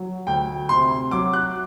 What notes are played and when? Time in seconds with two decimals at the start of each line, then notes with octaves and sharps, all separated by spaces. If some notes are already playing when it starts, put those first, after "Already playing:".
Already playing: F#3
0.27 D2 G5
0.69 C3 C6
1.11 F#3 D6
1.33 F#6